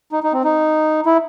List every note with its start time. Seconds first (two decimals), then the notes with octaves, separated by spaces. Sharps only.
0.12 D#4
0.23 D#4
0.33 C4
0.44 D#4
1.06 E4